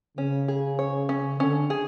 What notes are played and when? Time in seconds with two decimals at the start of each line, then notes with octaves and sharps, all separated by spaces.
0.18 C#3 C#4
0.48 G#4
0.79 C#5
1.09 C#4
1.39 D3 C#4
1.70 G#4